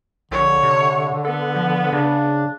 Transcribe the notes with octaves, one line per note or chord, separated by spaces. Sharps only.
A#1 D3 C#5
C3
B3 A4
F3
C#3 D4